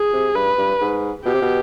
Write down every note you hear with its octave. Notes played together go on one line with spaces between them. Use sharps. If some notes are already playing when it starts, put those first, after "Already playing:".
Already playing: G#4
C3
G2 B4
G2
G#2
B2 G4
C3
B2